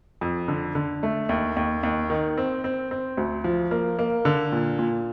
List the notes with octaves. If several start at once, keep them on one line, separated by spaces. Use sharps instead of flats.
F2
D3
D3
A3
D#2
D#2
D#2
D#3
C4
C4
C4
D2
F3
A#3
A#3
D3
A#2
A#2